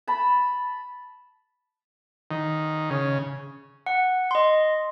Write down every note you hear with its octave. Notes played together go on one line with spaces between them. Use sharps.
A5 B5
D#3
C#3
F#5
D#5 C6